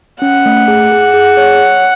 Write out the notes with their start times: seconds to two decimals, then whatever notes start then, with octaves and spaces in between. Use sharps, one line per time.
0.22 C#4 F#5
0.46 A3
0.68 G#4
0.92 G#4
1.14 G#4
1.37 C#5